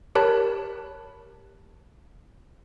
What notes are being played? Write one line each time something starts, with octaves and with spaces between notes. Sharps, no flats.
G4 A#4 C#5 A5 B5 F#6